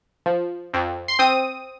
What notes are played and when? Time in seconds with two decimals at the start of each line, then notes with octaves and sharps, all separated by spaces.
0.26 F3
0.74 F2
1.08 C6
1.19 C4 D#6